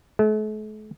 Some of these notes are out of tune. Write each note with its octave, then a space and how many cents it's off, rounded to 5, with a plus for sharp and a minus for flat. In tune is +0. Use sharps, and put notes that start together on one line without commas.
A3 -45